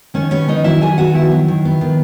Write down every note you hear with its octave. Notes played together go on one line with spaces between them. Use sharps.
D#3 C#4 C#5
B3 C#4 C#5
D#3 D#4 D#5
F#3 E4 E5
D#3 G#4 G#5
B3 F#4 F#5
D#3 E4 E5
F#3
D#3
B3
D#3